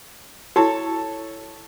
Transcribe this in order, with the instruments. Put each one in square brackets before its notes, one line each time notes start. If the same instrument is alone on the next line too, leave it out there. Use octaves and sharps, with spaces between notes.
[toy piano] E4 F#4 [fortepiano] A4 C#5 A5